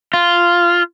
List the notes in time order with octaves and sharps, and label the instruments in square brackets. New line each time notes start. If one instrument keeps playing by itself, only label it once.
[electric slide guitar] F4